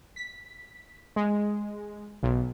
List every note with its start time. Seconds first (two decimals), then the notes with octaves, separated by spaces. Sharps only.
0.16 B6
1.16 G#3
2.23 B1